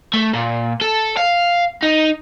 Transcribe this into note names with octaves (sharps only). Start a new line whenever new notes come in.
A3
A#2
A4
F5
D#4